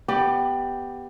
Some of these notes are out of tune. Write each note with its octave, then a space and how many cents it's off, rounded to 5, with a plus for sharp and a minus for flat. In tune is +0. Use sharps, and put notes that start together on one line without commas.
B3 +0 G4 +0 D5 +30